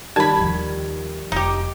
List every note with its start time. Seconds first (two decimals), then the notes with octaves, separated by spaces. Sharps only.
0.16 D#3 G3 A5 B5 G#6
0.37 D#2 F3
1.32 F1 D#4 G4